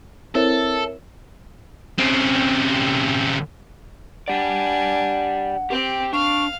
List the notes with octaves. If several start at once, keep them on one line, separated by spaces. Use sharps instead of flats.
C4 E4 A4 A#4 C#5 E5
C#3 C4
D4 G4 D5 F#5 G#5
C4 G4 G5
D4 F5 C#6